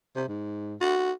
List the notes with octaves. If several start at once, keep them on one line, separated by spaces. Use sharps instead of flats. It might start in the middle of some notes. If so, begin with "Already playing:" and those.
C3
G#2
F#4